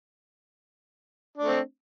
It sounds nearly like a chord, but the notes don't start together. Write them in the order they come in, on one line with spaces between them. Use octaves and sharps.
D4 A3 C4